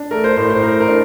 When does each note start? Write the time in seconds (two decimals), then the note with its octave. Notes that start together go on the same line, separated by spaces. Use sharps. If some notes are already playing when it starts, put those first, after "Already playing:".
Already playing: D4
0.11 A3 A#4
0.24 C5
0.37 A2 C5
0.50 C5
0.62 A2 A#4
0.80 A#4
0.88 D4